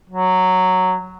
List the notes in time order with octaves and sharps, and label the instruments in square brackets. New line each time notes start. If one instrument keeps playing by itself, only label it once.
[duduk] F#3